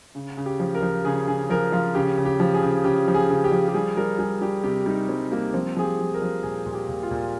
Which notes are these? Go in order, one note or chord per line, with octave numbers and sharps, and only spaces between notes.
C#3
C#3
G4
F3
A#4
F3
C#3 G#4
C#3 G#4
F3 A#4
F3 F4
C#3 G4
C#3
G4
F3
G#4
C#3
C#3 G4
F3
G#4
C#3
G4
F3
G4
G3 G#4
G3 A#4
G3 G#4
G3 G4
C3 G4
G3 D#4
G3 C4
G3 A#3
F3 C4
F3 G#4
G4
F3
A#4
F3
A#2 G#4
A#2
G4
A#2
F4
A#2